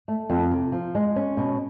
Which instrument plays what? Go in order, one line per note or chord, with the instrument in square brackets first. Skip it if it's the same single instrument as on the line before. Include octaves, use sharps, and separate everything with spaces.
[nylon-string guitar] A3
F2
C3
F3
G#3
C#4
B2